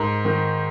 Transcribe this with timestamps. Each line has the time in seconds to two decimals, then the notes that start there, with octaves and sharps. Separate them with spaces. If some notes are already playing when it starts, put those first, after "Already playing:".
Already playing: G#2 A#4
0.25 D#3